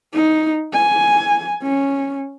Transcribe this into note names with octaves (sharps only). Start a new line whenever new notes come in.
D#4
G#5
C#4